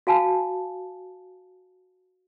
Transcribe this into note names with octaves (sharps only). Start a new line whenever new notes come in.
F#4 F5 G#5 A5